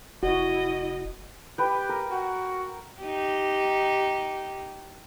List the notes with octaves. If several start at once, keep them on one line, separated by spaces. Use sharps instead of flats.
F1 E4 F#4 D#5
G4 B4 G5
A#4
F#4
D#4 G4